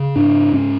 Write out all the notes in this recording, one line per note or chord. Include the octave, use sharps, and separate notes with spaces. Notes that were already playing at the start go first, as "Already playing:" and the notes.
Already playing: C#3
G#2 D4
G#2 C#4